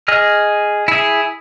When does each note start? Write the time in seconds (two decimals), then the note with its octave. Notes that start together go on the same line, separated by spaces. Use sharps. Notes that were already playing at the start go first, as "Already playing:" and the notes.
0.08 G#4 D#5 F6
0.88 E4 G#4